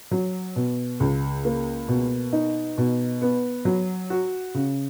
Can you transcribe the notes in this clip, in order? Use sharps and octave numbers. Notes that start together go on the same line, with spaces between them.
F#3
B2
C#2
A#3
B2
D#4
B2
B3
F#3
F#4
C#3